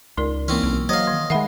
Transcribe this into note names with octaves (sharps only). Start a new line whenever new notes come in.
C#2 D#4 A#4 D5
E3 A#3 C4 C#4
B1
F#3 C5 D#5 F5
D#3
D#3 G#3 E5 F#5 B5